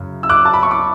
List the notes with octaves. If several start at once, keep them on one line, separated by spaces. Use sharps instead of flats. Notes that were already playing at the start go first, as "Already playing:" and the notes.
Already playing: F#2 C#3 F#3
E6
D6 F#6
A5
B5
C#6
D6